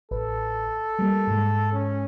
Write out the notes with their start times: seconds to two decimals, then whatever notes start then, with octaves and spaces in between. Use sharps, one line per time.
0.11 A1 A4 B4
0.99 G3 A#3
1.27 G#2 G#3
1.73 C#4